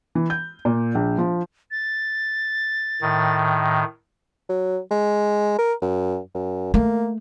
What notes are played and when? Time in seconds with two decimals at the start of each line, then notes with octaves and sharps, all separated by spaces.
0.15 E3
0.30 G6
0.65 A#2
0.95 A#1
1.18 F3
1.71 A6
3.02 A2 D#3
4.49 F#3
4.91 G#3
5.59 A#4
5.82 F#2
6.35 F#2
6.74 A3 A#3